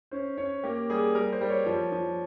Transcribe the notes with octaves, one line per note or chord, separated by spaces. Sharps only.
C#4 C5
C#4 C#5
A#3 G4
G3 G#4
G3 A#4
C5
G3
C#5
F3
F3